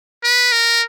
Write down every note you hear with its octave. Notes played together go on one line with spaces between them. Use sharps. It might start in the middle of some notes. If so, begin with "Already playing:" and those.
B4
A#4